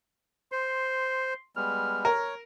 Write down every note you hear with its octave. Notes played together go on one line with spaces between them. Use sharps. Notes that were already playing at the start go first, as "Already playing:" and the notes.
C5 C6
G3 G#3 B3 F6
A#4 C#5